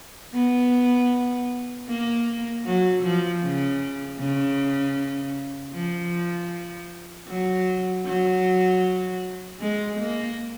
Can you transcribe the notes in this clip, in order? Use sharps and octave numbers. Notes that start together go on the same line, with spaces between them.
B3
A#3
F#3
F3
C#3
C#3
F3
F#3
F#3
G#3
A#3